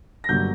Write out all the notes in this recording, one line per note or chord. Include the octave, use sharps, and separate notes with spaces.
A#6
G1 G2 F#3 A#3 G6